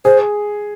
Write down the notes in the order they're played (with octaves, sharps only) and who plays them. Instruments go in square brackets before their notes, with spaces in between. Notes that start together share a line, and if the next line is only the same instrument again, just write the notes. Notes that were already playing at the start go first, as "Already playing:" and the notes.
[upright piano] G#4 [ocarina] C5